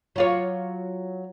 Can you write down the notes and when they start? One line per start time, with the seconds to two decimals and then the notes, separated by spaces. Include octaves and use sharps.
0.16 F#3 F4 C#5